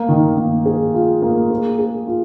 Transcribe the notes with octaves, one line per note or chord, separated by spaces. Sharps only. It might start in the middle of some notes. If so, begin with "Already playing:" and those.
Already playing: A#3
D#3
A#3
G#4
F4
A#3
G#4
G#4
F4